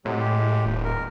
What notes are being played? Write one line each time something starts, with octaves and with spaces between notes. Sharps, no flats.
A2 C3 F#3 G#3
G#3 G4
D#1
A#4